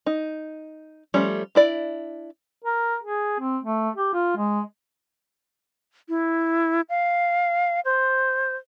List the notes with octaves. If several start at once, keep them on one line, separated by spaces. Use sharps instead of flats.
D#4
F3 G3 A3 C#4
D4 E4 D5
A#4
G#4
C4
A3
G4
F4
G#3
E4
F5
C5